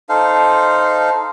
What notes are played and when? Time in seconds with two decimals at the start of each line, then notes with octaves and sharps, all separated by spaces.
0.09 D#4 A4 C5 F5